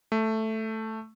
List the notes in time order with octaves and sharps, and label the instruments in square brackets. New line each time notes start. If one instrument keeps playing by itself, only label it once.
[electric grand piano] A3